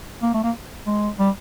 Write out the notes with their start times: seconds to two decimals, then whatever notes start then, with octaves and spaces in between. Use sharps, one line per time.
0.23 A#3
0.34 A3
0.44 A#3
0.87 G#3
1.19 G3